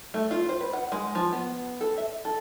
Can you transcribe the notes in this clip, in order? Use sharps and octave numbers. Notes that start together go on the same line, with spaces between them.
A3
F4
C5
B4
F#5
G#3
F3
B3
A4
E5
A4